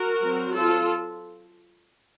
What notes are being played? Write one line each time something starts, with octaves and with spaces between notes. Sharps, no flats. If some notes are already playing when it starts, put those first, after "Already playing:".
Already playing: F#4 A#4
F#3 C4
F4 A4